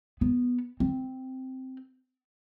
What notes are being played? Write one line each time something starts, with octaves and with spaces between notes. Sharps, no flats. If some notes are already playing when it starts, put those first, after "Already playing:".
B3
C4